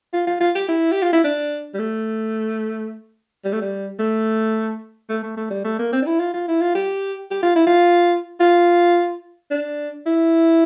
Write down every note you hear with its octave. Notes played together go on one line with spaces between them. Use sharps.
F4
F4
F4
G4
E4
G4
F4
E4
D4
G3
A3
G3
A3
G3
A3
A3
A3
A3
G3
A3
A#3
C4
D4
E4
F4
F4
E4
F4
G4
G4
F4
E4
F4
F4
D4
E4